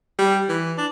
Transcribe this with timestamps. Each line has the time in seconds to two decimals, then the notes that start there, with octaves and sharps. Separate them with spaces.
0.19 G3
0.49 E3
0.78 D4